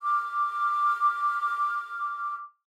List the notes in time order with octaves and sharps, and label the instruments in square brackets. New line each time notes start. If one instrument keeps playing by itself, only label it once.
[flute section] D6 F6